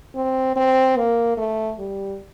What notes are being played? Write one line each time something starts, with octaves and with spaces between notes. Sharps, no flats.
C4
C4
A#3
A3
G3